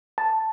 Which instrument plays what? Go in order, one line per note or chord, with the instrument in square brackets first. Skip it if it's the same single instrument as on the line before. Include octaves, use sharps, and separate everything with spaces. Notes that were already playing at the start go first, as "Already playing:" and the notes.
[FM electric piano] A5